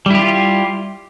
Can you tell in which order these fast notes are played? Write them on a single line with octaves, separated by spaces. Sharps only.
G3 E4 G4 F4